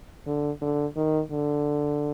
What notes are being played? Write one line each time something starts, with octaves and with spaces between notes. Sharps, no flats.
D3
D3
D#3
D3